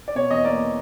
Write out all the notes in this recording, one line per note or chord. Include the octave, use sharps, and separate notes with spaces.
D5
B2 C#5
E2 D#5
A#3 D5